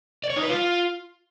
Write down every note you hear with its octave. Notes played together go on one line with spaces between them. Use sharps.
D5
C#5
D#4
B4
F4